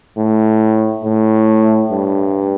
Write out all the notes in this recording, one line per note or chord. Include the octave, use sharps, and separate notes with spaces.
A2
A2
G2